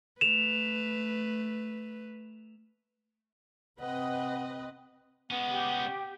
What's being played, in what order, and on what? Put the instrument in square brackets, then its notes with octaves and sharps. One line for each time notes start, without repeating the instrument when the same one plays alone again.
[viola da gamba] A3 B4 [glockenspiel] E7 F7
[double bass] C3 C4 [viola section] B4 D#5 [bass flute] F#5
[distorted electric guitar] G#3 C#4 [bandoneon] B3
[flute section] G4